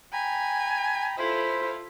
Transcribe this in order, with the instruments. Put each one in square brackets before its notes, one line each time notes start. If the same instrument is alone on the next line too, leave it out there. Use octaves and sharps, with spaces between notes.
[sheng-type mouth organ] G5 A#5 B5 [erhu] G#5
[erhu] E4 [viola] F4 A4 [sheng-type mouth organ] C5 B5